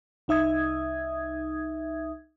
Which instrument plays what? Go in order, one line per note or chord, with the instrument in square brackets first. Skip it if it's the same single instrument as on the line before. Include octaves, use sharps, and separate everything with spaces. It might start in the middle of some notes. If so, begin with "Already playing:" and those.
[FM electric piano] C2 D#4 E5 D#6 G#6